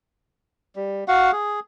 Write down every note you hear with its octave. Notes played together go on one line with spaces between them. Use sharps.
G3
F#4 F5 F#5
G#4